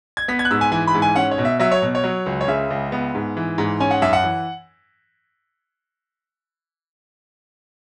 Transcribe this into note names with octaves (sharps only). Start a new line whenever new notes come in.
G#6
B3 B6
G#6
F#6
G#2 E6
G#5
E3 G#5
B5
G#2
G#5
C#4 F#5
C#5
B2
E5
F#3 E5
C#5
B2
C#5
F#3
C#2
C#5
C#3 E5
C#2
B3
G#2
E3
G#2
C#4 G#5
F#5
F#2 E5
F#5
E3